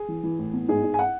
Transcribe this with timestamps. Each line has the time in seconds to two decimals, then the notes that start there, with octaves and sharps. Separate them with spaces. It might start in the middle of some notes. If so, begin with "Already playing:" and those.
Already playing: G#4
0.08 E3
0.23 E3
0.39 A2
0.53 B3
0.69 G#2 G#4
0.84 G#2
0.94 G#5
0.99 F#5